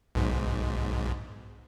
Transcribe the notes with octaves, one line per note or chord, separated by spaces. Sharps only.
B1 G#2